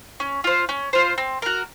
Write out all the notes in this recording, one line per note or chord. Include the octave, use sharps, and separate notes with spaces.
C#4
F4 C5
C#4
F4 C5
C4
F#4 A#4